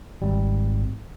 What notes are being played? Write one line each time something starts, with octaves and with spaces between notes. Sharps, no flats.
G#1 G3